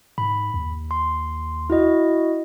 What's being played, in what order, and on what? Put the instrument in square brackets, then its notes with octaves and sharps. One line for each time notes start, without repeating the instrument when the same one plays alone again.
[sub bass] G#2 [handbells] B5
[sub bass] D#2
[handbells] C6
E4 F#4 D#5